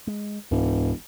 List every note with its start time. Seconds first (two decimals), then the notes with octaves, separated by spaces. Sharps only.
0.07 G#3
0.51 E1 C#2 G#2